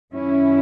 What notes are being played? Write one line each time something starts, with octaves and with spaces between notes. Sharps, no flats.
F#2 D#3 F#3 C#4 E4